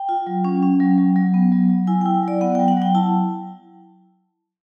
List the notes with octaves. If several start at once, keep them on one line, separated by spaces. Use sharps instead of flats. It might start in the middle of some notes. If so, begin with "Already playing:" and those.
Already playing: G5
F4
F#3
C#4
C#4
F#3
F#3
F#3
B3
F#3
F#3
E4 G#5
E4 G5
F#3 D5
B3 F#5
F#3 G5
F#5
F#3 G5
E4 A5